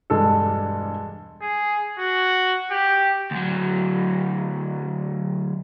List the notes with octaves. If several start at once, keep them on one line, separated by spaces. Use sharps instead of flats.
E1 G2 G#3 D4 A4
G#4
F#4
G4
D2 F#3